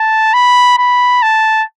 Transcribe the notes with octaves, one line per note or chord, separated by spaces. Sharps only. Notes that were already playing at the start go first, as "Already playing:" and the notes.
Already playing: A5
B5
B5
A5